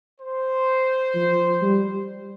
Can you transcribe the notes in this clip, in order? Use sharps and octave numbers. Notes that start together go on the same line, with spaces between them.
C5
F3
G3